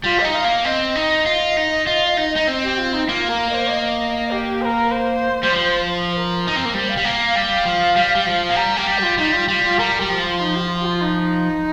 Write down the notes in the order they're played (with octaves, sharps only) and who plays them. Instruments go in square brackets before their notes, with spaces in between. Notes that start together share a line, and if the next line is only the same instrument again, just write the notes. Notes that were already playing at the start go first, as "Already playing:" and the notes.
[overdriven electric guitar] G3 [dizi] F4
[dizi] D#5
[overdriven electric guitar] D#4
[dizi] F5
[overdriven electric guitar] A#3
[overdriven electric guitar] C4 [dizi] D#5
[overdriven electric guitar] D#4
F4
D#4
F4
D#4
D#4
C4
[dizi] G4
F4
D#4
[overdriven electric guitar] A#3 [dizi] F4
[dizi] A#4
D#5
C5
D#5
G4
C5
A#4
C5
[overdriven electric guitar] G3
F3
[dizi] C5
A#4
[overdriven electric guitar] D#4
C4
A#3
[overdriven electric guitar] G3 [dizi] C5
[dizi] F5
[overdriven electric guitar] G3
[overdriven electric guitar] A#3 [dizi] F5
[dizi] F5
[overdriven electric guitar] G3
F3
G3
G3
F3
A#3
[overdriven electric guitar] G3 [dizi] A#5
[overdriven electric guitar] A#3 [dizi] G5
[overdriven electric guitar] G3
[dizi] G4
F4
[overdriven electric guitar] G3 [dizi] D#4
[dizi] F4
[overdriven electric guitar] G3 [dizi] F4
[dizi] F4
[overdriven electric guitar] G3 [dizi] A#4
[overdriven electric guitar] G3 [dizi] G4
[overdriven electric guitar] F3
[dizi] F4
D#4
G4
F4
G4
F4
D#4